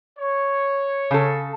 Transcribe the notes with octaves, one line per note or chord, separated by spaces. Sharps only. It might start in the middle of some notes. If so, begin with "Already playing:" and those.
C#5
C#3 A4